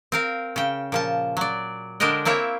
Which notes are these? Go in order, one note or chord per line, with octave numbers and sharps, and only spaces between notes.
C4 A#4 F5
C#3 G5
A#2 F3 A5
F#3 D5
D3 G#3 D4 A#4 D#5 G5
A#3 C4 E4 C#5 E5